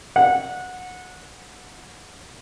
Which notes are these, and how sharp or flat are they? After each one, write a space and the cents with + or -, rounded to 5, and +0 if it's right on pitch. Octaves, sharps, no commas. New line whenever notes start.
F#5 -20